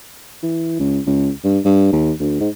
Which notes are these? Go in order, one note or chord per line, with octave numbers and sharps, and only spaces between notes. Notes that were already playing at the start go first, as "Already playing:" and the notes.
E3
C#2
C#2
G2
G2
D#2
D2
G#2